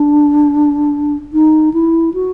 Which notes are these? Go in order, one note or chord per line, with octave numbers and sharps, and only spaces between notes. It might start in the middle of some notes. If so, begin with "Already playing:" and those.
Already playing: D4
D#4
E4
F#4